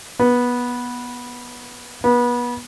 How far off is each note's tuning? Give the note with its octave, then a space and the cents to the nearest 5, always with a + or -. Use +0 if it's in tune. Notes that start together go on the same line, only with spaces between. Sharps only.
B3 -15
B3 -30